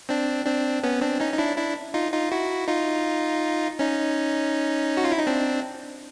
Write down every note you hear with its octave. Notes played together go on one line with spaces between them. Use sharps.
C4 D4
C4 D4
B3 C#4
C4 D4
C#4 D#4
D#4
D4 E4
D4 E4
D#4 F4
D#4 F4
E4 F#4
D#4 F4
C#4 D#4
F#4
F4
E4
D#4
C4 D4